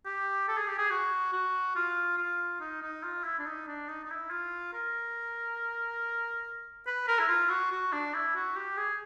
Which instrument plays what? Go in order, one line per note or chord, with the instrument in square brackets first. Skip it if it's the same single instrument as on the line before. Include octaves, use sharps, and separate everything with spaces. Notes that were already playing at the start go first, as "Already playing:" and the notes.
[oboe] G4
A4
G#4
G4
G#4
F#4
F#4
F4
F4
D#4
D#4
F4
E4
D4
D#4
D4
D#4
D#4
E4
F4
A#4
B4
A#4
E4
F4
F#4
F#4
D4
E4
F#4
G4
G#4